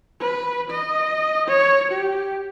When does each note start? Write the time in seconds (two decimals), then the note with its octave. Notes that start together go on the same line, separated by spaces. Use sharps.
0.20 B4
0.70 D#5
1.48 C#5
1.92 G4